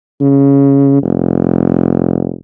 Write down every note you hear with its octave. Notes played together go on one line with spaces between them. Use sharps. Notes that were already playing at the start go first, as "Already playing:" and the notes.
C#3
F1